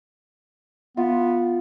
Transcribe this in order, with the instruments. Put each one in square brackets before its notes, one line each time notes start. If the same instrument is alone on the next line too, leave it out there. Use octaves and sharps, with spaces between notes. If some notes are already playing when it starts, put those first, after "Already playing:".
[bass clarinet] B3 [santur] F4